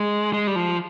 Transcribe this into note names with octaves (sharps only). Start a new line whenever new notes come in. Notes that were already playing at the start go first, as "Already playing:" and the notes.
Already playing: G#3
G#3
G3
F3